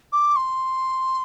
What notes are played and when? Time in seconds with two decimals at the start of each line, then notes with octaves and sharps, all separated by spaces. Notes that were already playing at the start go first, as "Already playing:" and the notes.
0.12 D6
0.36 C6